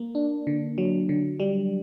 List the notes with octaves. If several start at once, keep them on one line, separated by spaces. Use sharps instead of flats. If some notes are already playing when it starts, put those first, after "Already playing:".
Already playing: A#3
D4
D3
F#3
D3
G3